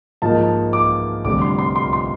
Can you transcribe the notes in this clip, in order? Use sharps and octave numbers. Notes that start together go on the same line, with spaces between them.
G#2 F3 A#3 D#4 A5
D6
F1 F2 D3 G3 D6
C6
C6
C6
C6